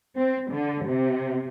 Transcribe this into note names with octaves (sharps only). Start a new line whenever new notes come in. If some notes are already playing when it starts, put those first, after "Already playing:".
C4
D3
C3